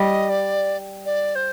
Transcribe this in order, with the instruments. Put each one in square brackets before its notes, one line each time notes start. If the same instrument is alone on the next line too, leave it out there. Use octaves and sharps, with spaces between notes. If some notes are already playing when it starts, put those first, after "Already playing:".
Already playing: [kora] G3 [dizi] D#5
[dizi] D5
D5
C5